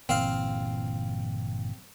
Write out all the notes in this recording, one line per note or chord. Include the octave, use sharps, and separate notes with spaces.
G1 A#2 E3 C4 F5